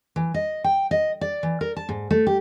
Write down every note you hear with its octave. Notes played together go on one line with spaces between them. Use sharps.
E3
D#5
G5
D#5
D5
E3
A#4
A5
G#2
A3
G4